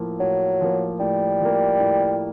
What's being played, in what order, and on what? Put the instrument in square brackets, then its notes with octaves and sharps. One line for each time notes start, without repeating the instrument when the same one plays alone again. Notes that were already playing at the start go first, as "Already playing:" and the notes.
Already playing: [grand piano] A2 F3 A#3
[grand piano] A2 [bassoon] F#3
[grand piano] F3 A#3
[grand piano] A2 [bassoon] G3
[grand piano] F3 A#3
A2